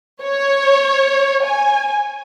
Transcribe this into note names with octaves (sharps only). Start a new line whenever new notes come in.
C#5
G#5